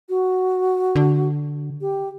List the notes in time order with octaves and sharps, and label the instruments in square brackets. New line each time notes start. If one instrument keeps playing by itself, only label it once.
[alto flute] F#4
[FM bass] D3
[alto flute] G4